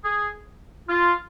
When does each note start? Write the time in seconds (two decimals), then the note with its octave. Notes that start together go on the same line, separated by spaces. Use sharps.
0.02 G#4
0.87 F4